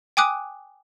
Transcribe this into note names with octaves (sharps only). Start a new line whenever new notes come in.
G5 G#5 D6 D#6 F#6